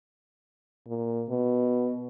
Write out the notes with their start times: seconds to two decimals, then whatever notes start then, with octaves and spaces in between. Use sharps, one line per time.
0.87 A#2
1.29 B2